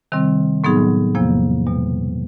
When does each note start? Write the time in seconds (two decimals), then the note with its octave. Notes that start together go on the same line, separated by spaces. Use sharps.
0.12 C3 D#3 G3 C4
0.64 A2 F#3 B3 D#4 G#4
1.15 E2 C3 F3 A#3
1.66 E2 B2 G3